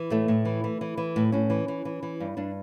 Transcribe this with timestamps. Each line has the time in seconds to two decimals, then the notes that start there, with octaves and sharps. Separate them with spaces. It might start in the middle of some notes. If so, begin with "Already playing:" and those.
Already playing: E3
0.10 A2 A3
0.28 A2
0.45 E3
0.64 E3
0.81 E3
0.97 E3
1.16 A2
1.32 A2 C#4
1.50 E3
1.68 E3
1.85 E3
2.03 E3
2.20 G2
2.37 G2 D4